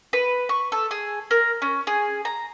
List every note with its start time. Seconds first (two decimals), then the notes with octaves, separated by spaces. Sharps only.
0.13 B4
0.49 C#6
0.72 A4
0.91 G#4
1.31 A#4
1.62 C#4
1.87 G#4
2.25 A#5